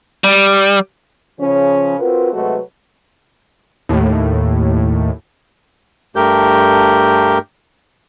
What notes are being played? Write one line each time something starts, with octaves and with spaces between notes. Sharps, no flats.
G3
C#3 F3 C#4
C4 F4 F#4 A#4 B4
C3 F#3 G#3 A3 F#4 B4
D#2 A2
G2 A3 G4 A#4 G6